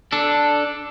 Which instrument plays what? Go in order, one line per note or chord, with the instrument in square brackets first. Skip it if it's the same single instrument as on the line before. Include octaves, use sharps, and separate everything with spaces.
[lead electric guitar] D4 A4